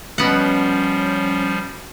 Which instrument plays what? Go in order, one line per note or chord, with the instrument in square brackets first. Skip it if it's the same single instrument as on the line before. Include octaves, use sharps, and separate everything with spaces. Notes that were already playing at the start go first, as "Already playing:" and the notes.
[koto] B2 B3 F#5 [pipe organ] F3 G3 [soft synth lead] C#4